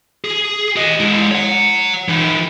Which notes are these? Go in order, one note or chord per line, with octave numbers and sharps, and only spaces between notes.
G#4
G4 D#5
G#3 E4
C#5 F#5
E3 D#4